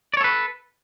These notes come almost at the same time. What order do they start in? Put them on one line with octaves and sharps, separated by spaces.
D5 C#5 A4 B4